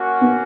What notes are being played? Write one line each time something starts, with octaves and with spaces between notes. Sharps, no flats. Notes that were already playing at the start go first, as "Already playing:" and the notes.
Already playing: A#3 C#4 F#4
B3